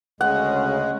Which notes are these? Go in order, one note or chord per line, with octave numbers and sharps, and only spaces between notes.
D2 C#3 G#3 F#5